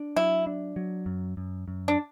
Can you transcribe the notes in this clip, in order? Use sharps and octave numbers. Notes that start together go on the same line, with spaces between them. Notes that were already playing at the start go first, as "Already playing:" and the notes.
Already playing: D4
F#3 E4
D4
F#3
F#2
F#2
F#2
D4